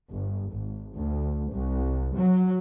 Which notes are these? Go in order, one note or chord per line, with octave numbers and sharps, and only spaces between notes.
G1
G#1
D2
C2
F#3